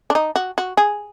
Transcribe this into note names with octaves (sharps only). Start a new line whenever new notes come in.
D4
D#4
F#4
F#4
G#4